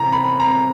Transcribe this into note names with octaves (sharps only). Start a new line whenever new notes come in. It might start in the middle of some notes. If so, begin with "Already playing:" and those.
Already playing: C3 E3 A#5
B5
A#5